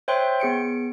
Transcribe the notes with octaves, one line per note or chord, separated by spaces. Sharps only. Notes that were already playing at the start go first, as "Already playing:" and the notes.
C5 C#5 E5 G5 C6 F#6
B3 G#4 C#7 D7